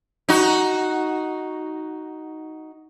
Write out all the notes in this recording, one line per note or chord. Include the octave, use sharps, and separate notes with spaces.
D#4 F#4